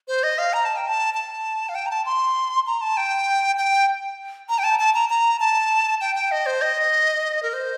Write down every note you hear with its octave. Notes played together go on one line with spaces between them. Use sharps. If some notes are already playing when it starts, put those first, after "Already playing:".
C5
D#5
F5
A#5
A5
G5
A5
A5
F5
G5
A#5
A5
C6
A#5
A5
G5
G5
A#5
G5
A5
A5
A#5
A#5
A5
G5
G5
D#5
C5
D#5
A#4
C5